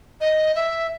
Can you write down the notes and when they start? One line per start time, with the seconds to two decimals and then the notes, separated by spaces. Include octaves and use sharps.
0.21 D#5
0.56 E5